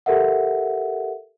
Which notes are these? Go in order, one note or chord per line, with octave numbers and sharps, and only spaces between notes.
G4 A4 A#4 E5 F#5